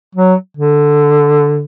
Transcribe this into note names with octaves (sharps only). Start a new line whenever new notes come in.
F#3
D3